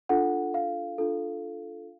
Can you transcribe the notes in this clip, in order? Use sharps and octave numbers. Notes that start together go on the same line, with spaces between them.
D4 F4 A4 F#5
F5
D4 F4 A4